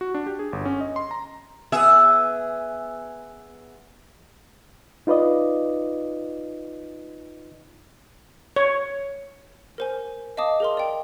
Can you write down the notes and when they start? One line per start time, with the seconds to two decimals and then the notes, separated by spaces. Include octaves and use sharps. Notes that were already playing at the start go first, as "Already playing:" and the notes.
0.01 F#4
0.14 D4
0.27 G4
0.39 G#4
0.53 G1
0.65 C#4
0.81 D#5
0.96 C6
1.11 A#5
1.72 B3 G#4 E5
5.07 D#4 F4 B4 D5 D#5
8.56 C#5
9.78 A#4 C5 G#5
10.37 D#5 F5 A5 D6 D#6
10.60 G#4 A#4 C6
10.77 D5 G5